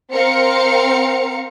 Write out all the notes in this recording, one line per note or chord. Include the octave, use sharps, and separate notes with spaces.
C4 A#4 F5 C#7